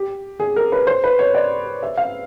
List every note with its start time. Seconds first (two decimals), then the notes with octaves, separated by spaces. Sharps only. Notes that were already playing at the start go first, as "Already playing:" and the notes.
Already playing: G4
0.40 G#4
0.56 A#4
0.72 B4
0.87 C5
1.04 B4
1.19 C#5
1.35 D5
1.83 E5
1.97 F5